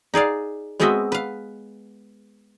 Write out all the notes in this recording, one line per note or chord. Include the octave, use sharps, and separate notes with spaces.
D#4 G#4 D5 F5
G#3 B3 C4 F#4 D#5 E5
B4 F5